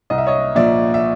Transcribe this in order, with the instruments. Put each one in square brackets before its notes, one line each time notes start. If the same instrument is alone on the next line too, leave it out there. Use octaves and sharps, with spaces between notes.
[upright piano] C2 D#5
E5
C#5 D#5
A#2 F3 D5 E5
E5